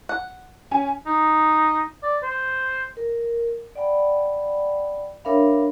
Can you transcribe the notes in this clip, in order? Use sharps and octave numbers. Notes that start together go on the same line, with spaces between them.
F#5
C#4 G#5
D#4
D5
C5
A#4
D5 F#5 G5 B5
D4 A#4 C#5 E5 F5 B5